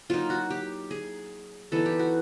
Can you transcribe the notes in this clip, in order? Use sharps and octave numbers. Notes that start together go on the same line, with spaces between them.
F#3 A#3 D#4 F4
F#4
G4
G#4
E3 G3 B3 D#4 A4
G4
F#4